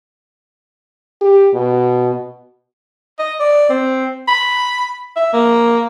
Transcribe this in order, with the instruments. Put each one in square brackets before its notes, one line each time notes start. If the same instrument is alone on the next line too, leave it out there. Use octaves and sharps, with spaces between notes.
[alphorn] G4
B2
[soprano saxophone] D#5
D5
C4
B5
E5
A#3